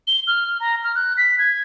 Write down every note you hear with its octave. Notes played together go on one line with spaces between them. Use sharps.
G7
F6
A#5
F6
F#6
B6
G#6